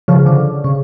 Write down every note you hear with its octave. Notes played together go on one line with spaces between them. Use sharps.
C#3 F3
D3
C#3